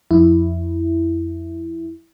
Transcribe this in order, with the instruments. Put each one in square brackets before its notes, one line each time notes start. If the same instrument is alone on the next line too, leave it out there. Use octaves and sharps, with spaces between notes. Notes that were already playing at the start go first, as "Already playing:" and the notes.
[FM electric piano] F2 E4